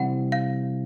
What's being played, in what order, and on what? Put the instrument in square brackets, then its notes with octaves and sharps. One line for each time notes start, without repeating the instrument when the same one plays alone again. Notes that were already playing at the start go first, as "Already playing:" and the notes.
Already playing: [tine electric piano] C3 E3 G3 C4 E4 [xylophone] F#5
[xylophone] F5